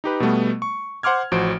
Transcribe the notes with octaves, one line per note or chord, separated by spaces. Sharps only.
D#4 G4 B4
B2 G3 A3 B3
C#6
C5 F#5 C6 D6 F6 G#6
A1 F3 F#4 C5 D7